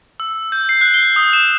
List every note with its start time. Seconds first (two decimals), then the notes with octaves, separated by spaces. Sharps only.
0.20 E6
0.52 G6
0.69 C7
0.81 F#6
0.94 G7
1.16 D#6
1.33 E7